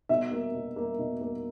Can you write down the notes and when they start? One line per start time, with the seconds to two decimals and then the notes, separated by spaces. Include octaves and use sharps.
0.09 B2 E5
0.31 A#3
0.54 B2
0.76 A#3
0.99 B2
1.21 A#3